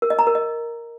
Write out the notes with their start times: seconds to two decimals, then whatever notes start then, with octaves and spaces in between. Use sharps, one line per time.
0.02 A#4
0.10 D#5
0.19 A#5
0.27 A#4
0.35 D#5